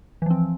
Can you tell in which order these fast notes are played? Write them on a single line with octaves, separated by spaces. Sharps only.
E3 F3 C4